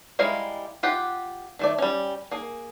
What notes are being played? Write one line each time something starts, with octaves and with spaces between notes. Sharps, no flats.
G3 G#3 E4 F5 A#5
F4 G4 F#5
D#3 A3 D5
G3 C#4
A#3 G#4